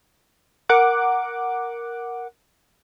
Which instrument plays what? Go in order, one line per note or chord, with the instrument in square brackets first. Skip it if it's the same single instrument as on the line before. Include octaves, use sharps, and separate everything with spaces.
[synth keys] A#4 F#5 D6